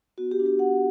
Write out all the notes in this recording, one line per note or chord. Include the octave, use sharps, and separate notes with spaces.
B3 F#4
G4
D4 F#4
G4
B3 F#5